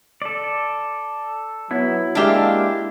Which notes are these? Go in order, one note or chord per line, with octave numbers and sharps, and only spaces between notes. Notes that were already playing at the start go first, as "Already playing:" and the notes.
A4 D5
F#3 B3 E4
G#3 A#3 D4 G4 E5 F5